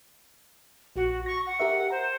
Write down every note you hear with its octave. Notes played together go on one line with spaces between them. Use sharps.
A#1 F#4
C#6 A#6
F#5
G4 A#4 E5
C5 A#5